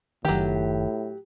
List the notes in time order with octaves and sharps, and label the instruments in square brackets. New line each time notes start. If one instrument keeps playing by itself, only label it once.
[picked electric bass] F#1 D#3 [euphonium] A2 [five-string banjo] F#3 G4